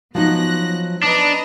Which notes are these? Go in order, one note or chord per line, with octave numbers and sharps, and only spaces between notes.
F3 F#3 B3 D#4 F#6 A#6
D4 B4 D#5 A#5